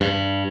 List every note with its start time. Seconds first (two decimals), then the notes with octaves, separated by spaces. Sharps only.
0.01 G2